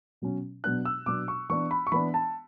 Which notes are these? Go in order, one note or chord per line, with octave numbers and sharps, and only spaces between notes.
B2 F#3 C#4
B2 F#3 B3 D4 F#6
E6
B2 F#3 B3 D4 D6
C#6
E3 B3 D4 C#6
B5
C#6
E3 B3 D4 B5
A5